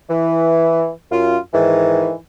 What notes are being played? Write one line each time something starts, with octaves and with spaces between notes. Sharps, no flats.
E3
F#2 F4
G#2 D#3 E3